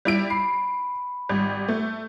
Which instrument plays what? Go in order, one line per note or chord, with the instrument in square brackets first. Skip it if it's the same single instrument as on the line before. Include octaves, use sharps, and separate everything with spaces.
[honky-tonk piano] G3 E4 D7
[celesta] B5 [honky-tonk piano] C7
[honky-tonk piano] G#1 G3
A3